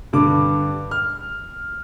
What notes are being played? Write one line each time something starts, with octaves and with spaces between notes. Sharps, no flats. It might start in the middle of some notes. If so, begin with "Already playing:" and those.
G2 D3 D6
F6